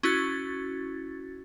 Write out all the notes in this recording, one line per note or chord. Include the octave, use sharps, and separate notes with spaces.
C#4 E4 F#4 A6